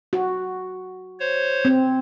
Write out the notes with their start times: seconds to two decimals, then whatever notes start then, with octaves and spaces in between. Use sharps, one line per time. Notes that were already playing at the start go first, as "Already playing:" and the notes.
0.13 F#4
1.20 C5 C#5
1.65 C4